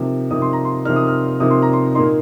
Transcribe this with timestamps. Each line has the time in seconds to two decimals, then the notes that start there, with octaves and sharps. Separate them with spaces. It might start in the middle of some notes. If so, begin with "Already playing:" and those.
Already playing: C3 F3 A#3 D#4
0.31 C3 F3 A#3 D#4 D#6
0.42 C6
0.53 A#5
0.65 C6
0.85 C3 F3 A#3 D#4 F6
0.96 D#6
1.07 F6
1.40 C3 F3 A#3 D#4 D#6
1.51 C6
1.62 A#5
1.73 C6
1.95 A#2 A#3 D#4 C6